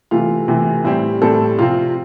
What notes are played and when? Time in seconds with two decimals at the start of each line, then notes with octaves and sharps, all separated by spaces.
0.11 C3 E3 A3 F4
0.48 C3 E3 A3
0.84 A2 G3 C4 E4
1.22 A2 G3 C4 A4
1.58 C3 F3 C4 F4